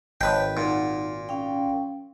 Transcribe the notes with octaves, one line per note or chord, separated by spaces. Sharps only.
G#1 B4 C#5 D#5 G5 A5
A#2 D#4 F#5
C#4 F5 G5